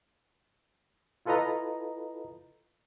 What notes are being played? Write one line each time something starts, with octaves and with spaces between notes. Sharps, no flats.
E4 F4 A4 B4 D#5 A#5